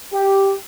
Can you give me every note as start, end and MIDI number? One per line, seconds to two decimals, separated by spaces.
0.13 0.52 67